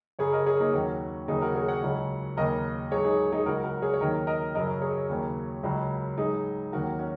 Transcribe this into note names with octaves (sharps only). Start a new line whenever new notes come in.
F#2 C#3 F#3 G#4 C#5
A#4 D#5
G#4 C#5
A#3 D#4
D#2 D#3 F#3 C#4 F#4
D#2 C#3 F#3 D#4 G#4
F#4 A#4
G#4 C#5
C#5 F#5
C#2 C#3 F#3
D#2 C#3 F#3 A#4 D#5
G#2 F#3 G#4 C#5
D#4 G#4
D#4 G#4
C#2 C#3 F#3 F#4 A#4
F#4 A#4
G#4 C#5
C#5
D#2 D#3 F#3 A#4 D#5
A#4 D#5
F#2 C#3 F#3 A#4 D#5
G#4 C#5
D#2 C#3 F#3
C#2 C#3 F#3
G#2 F#3 D#4 G#4
D#2 D#3 F#3 F#4 A#4
C#4 F#4